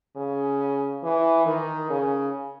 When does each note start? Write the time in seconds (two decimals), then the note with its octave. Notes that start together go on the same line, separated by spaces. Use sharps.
0.17 C#3
1.03 E3
1.46 D#3
1.90 C#3